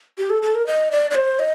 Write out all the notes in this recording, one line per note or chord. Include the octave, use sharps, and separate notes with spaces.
G4
A4
A4
A#4
D#5
D5
D5
C5
D#5